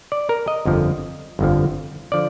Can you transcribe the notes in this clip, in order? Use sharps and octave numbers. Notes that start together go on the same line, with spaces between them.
D5
A#4
D#5
G1 F2 D3 F3
G1 F2 D3 F3
D3 F3 D5